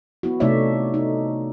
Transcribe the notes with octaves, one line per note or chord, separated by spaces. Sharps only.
B3 E4 F#4
C3 A3 D#4 C#5 D5 E5
D#4